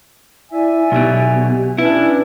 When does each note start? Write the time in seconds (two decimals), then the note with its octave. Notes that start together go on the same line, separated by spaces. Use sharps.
0.52 E4 D5 E5 G#5
0.92 B1 B2 G4
1.78 C#4 D4 E4 B4